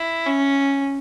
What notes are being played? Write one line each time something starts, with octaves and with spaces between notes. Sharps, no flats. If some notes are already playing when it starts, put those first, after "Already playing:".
Already playing: E4
C#4